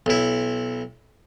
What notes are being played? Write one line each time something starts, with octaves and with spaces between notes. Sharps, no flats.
B1 E4